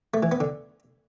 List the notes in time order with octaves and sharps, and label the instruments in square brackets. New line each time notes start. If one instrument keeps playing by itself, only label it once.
[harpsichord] A3
E3
B3
D3